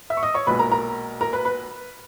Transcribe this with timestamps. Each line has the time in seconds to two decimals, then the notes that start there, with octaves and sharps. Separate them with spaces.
0.10 E5 E6
0.17 C#6
0.23 D#5 D#6
0.34 C#5 C#6
0.47 B1 A#2 G#3 B4 B5
0.59 A#4 A#5
0.72 A#4 A#5
1.21 A#4 A#5
1.33 B4 B5
1.45 B4 B5